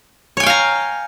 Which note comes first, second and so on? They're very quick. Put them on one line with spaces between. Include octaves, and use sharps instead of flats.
C#5 G#5 G5 F5 A#5